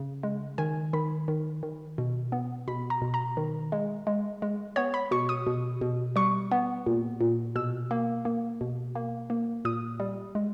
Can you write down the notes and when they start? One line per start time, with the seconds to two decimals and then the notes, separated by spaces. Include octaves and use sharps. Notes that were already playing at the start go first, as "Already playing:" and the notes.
Already playing: C#3
0.23 G#3
0.58 D#3 G#5
0.93 D#3 B5
1.28 D#3
1.63 D#3
1.98 B2
2.32 B3
2.68 B2 B5
2.90 A#5
3.02 B2
3.14 A#5
3.37 D#3
3.72 G#3
4.07 G#3
4.42 G#3
4.76 B3 C#5
4.94 B5
5.11 B2 C#6
5.29 D#6
5.47 B2
5.81 B2
6.16 G3 C#6
6.52 B3
6.86 A#2
7.21 A#2
7.56 B2 E6
7.91 A#3
8.25 A#3
8.61 B2
8.95 A#3
9.30 A#3
9.65 A#2 D#6
10.00 G3
10.35 G#3